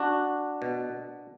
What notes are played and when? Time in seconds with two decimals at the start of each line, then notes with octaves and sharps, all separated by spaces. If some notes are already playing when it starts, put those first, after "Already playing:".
Already playing: D4 F#4
0.62 B2